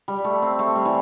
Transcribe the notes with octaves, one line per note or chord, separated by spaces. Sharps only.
G3
A3
C4
A3
G3
E3